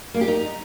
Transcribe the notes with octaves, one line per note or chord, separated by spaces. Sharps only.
A#3
G4
D#4